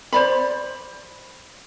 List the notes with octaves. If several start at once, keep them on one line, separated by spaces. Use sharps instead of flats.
C5 D5 B5